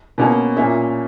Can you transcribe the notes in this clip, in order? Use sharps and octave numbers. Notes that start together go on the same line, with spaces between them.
B2 A#3 C#4
A#2 A#3 C#4 E5